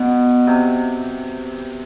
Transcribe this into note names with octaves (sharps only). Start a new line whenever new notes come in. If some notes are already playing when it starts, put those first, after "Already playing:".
Already playing: B2
C3